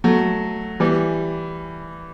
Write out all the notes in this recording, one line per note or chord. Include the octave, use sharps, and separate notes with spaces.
F#3 A3
E3 G3